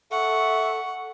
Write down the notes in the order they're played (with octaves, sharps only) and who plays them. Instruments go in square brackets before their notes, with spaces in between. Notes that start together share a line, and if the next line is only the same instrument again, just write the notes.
[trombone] A4 [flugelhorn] E5 [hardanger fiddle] F#5 [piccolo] C#6